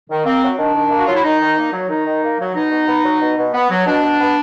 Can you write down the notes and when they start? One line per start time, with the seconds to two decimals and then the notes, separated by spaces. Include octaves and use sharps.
0.10 D#3
0.25 A#3 C4
0.43 F#3
0.58 D#3 D4
0.75 D#3
0.91 A#3
0.97 F#4
1.06 F#3 F4
1.15 E4
1.24 D#3 D#4
1.41 D#3
1.57 A#3
1.73 F#3
1.89 D#3 D#4
2.06 D#3
2.22 A#3
2.39 F#3
2.55 B2 D#4
2.71 B2
2.87 B3
3.04 F#3
3.21 B2
3.38 B2
3.53 B3
3.70 F#3
3.86 B2 D4
4.03 B2
4.19 B3